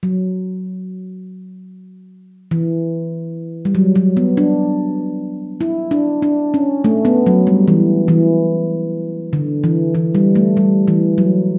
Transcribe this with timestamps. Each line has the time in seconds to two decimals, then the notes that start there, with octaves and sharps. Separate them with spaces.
0.03 F#3
2.51 E3
3.65 G3
3.75 F#3
3.96 F#3
4.17 B3
4.37 D4
5.61 E4
5.91 D4
6.22 D4
6.54 C#4
6.84 A3
7.05 B3
7.26 F#3
7.47 G3
7.68 E3
8.08 E3
9.33 D3
9.64 E3
9.95 E3
10.15 G3
10.35 A3
10.57 G3
10.88 E3
11.18 F#3